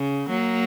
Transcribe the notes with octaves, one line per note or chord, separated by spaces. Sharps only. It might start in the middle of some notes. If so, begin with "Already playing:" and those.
Already playing: C#3
F#3 A#3